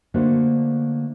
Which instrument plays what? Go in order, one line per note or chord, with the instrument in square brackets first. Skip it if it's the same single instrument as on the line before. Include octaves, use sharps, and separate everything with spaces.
[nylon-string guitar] D3 A3 A#3 F#4 G#4 C5